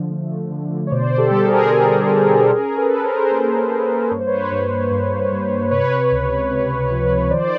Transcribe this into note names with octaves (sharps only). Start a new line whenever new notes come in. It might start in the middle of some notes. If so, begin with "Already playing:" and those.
Already playing: D3 F3
A3
D3
C#5
B2 C5 D5
G4 A4
G3
G#4 A#4
G3
B2
C#4 G#4 A#4
A4 B4
C#4
A#4 C5
A#3
A#3
G2 C#5
C5
B4 C#5
G2
G2
G2
C3 B4 C#5
C#2
C3
F3
D#3 C5 D5